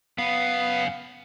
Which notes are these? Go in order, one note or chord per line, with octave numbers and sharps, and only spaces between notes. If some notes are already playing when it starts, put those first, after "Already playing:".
F#2 B3 F5